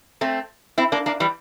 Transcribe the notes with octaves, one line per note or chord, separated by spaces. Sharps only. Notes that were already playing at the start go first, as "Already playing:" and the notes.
A3 C4
C4 E4
A#3 D4
A#3 D4
E3 G3